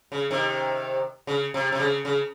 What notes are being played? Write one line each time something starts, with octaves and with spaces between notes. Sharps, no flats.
C#3
C3 D#3
C#3
C3
C3
C#3
C#3